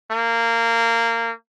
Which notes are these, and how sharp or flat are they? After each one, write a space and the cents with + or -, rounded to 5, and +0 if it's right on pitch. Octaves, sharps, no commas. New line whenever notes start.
A#3 -20